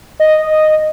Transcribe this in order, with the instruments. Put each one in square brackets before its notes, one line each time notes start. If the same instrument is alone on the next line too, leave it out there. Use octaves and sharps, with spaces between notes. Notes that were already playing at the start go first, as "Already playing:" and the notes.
[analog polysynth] D#5